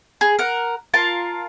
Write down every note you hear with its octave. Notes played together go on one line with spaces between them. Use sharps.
G#4
A#4 F#5
F4 A#4 A5